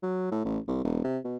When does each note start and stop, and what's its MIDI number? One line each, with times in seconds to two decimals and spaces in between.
0.03 0.27 54
0.32 0.43 45
0.45 0.59 33
0.68 0.84 36
0.84 1.02 28
1.04 1.18 48
1.25 1.37 47